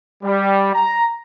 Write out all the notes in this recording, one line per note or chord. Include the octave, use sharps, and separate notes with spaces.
G3
A#5